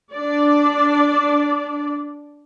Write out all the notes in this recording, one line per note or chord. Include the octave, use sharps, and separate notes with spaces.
D4 D5